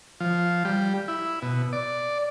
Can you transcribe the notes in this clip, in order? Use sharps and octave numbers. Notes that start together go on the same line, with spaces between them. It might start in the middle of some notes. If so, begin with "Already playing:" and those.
F3
G3
E4
B2
D5